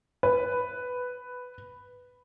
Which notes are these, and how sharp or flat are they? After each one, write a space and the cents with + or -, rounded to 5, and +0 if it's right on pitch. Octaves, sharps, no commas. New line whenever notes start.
B4 +5